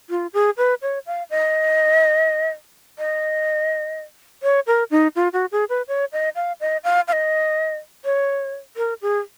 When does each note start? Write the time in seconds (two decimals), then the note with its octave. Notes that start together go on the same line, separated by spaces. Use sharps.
0.10 F4
0.33 G#4
0.57 B4
0.82 C#5
1.06 F5
1.30 D#5
2.99 D#5
4.43 C#5
4.67 A#4
4.91 D#4
5.16 F4
5.33 F#4
5.52 G#4
5.69 B4
5.88 C#5
6.12 D#5
6.35 F5
6.60 D#5
6.84 F5
7.08 F5
7.13 D#5
8.05 C#5
8.77 A#4
9.02 G#4